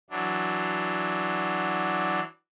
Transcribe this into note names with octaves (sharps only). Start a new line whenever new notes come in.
E3 F#3 D4